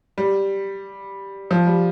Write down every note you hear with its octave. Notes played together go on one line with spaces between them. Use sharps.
G3
F3
G3